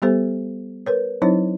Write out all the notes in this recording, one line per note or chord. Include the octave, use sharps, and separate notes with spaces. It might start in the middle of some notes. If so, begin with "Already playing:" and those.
G3 B3 G4 A4 C5
A#4 B4 C#5
F#3 C4 D#4 E4 C5 C#5